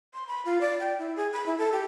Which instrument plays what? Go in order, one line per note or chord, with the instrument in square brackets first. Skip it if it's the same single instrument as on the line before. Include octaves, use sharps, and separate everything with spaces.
[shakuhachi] C6
B5
F4
D5
G5
E4
G#4
B5
E4
A4
G4